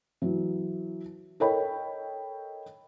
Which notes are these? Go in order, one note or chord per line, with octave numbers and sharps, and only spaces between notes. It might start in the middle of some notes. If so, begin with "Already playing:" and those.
E3 F#3
A4 A#4 C#5 D#5 G5 B5